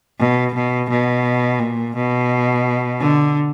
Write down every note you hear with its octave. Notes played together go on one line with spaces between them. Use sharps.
B2
B2
B2
A#2
B2
D3